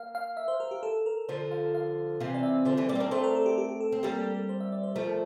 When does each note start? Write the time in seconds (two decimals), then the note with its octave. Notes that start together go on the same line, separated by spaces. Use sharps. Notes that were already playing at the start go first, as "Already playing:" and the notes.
Already playing: A#3 F5
0.15 F5
0.37 E5
0.48 C5
0.60 A#4
0.71 G4
0.83 A4
1.06 A#4
1.28 D3 F3 C5
1.51 F5
1.74 F5
2.20 C3 E3 F5
2.34 D5
2.43 E5
2.65 D3 F3 C5
2.77 E3 G3
2.89 G3 A#3 D5
2.95 C4
3.00 A#3 D4
3.11 A3 C4 C5
3.24 A#4
3.35 A4
3.46 G4
3.58 G4
3.69 G4
3.81 A4
3.92 C4
4.03 G3 A#3 G4
4.19 A4
4.34 A4
4.49 C5
4.60 E5
4.72 D5
4.83 C5
4.95 F3 A3 A#4